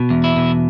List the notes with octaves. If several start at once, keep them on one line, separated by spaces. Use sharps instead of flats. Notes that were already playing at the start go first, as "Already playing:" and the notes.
Already playing: B2
E2
E4
B2